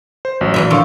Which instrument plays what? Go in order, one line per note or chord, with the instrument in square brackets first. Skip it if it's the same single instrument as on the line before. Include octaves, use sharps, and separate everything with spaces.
[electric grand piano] C5
A1 F#3
[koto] A#2 E3 E5
[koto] A2 D3 F3 [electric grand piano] F5 C#6 E6